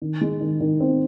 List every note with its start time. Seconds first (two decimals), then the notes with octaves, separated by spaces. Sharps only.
0.02 D#3
0.21 G#3
0.41 D#3
0.60 D#3
0.80 C4